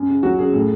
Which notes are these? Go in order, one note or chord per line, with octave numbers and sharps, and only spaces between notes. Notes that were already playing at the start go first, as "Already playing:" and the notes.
Already playing: F#2
C#3
F#3 F#4
F#2 G#4
A2